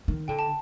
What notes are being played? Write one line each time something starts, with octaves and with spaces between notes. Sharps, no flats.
D#3
D3 G5
A5